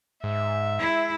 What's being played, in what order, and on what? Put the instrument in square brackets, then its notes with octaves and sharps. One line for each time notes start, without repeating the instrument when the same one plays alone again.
[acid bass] G#2 [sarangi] E5
[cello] G#3 E4